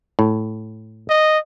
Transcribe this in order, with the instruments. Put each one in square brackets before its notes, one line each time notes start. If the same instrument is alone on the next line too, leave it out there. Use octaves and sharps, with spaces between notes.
[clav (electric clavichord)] A2
[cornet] D#5